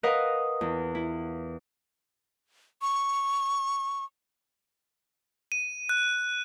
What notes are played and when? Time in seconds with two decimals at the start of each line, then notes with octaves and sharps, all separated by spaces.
0.03 A#4 B4 D#5 F5 F#5
0.61 E2
0.95 E4
2.82 C#6
5.52 D#7
5.89 F#6